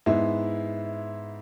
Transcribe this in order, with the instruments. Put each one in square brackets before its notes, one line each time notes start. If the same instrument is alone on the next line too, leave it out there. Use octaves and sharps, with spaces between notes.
[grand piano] G#2 G#3 B3 [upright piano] E4